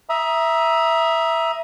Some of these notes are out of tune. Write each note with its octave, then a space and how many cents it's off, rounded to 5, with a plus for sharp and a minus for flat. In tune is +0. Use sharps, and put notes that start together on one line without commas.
E5 +0 A#5 +25 D#6 +10